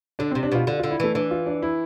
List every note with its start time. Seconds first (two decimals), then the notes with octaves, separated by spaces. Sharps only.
0.19 D3 D4
0.31 C3 C4
0.43 D4
0.52 B2 F4
0.67 D3 F4
0.79 D3 F4
0.91 E4
1.00 E3 A3
1.15 E3 D4
1.31 F4
1.47 D4
1.63 E4